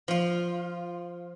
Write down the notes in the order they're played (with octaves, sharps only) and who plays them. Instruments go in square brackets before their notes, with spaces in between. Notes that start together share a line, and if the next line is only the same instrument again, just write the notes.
[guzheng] F3 F4